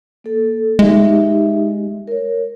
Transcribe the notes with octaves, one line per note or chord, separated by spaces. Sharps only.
A#3 A4
G#3 D#4 G4 E5
A#4 C#5